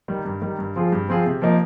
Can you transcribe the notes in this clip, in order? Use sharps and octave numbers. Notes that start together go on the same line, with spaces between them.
D#3 G3
G2
D#3 G3
G2
F3 C4 F4 G#4
G2
F3 C4 F4 G#4
C3
F3 A#3 D#4